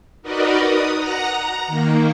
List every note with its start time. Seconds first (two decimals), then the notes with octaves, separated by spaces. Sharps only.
0.22 D#4 F#4 A#4 B4 D5 D#5
0.57 D#6
0.95 F#5 A#5 A#6
1.32 A#5
1.67 D#3 A#3